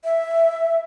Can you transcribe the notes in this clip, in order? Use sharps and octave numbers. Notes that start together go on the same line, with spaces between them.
E5